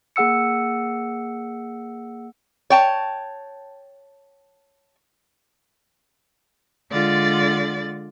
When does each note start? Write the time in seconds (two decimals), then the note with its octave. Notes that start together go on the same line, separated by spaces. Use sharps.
0.16 A#3 G#4 F#5 E6 C#7
2.70 C#5 G5 A5
6.91 D3 G#3 F4 D5 A6